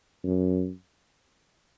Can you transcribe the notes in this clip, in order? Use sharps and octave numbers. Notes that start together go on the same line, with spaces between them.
F#2